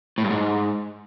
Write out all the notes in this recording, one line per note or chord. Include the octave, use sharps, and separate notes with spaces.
A2
G2
G#2